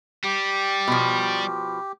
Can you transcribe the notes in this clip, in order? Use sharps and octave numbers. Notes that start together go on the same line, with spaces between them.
G3 G4
B2 F3